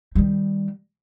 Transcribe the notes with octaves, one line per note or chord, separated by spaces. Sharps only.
D#3 G3